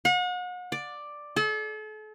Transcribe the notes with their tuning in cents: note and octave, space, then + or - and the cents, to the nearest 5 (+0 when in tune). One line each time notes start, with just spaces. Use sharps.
F#5 -40
D5 +5
A4 -40